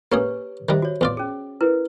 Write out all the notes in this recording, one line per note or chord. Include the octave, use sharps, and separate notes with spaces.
A#3 C#4 G4 G#4 B4 C#5
D#3 G3 C5 E5
F#4 C#5
E2 F4 D5
C#4 G#4
E4 A#4 B4